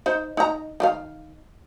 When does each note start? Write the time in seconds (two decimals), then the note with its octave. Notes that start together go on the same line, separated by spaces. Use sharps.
0.06 D#4 C5
0.37 D#4 A#5
0.80 D#3 G4 F5